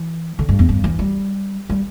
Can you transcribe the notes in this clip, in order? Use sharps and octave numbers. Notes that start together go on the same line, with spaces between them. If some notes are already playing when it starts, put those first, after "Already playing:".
Already playing: E3
D3
G2
E2
G2
E3
G3
G3